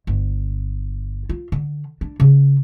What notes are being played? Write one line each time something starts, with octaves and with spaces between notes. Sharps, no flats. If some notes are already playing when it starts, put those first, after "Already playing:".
G1
F4
D3
D4
C#3